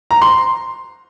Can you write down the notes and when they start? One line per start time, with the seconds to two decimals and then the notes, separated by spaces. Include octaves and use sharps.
0.11 A#5
0.22 C6